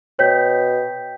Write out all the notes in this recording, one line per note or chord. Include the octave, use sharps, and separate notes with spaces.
B2 C#5 G5 G6 B6